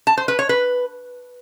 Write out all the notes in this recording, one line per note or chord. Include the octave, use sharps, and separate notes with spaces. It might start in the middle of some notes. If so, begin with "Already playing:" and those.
A5
C5
B4
C#5
B4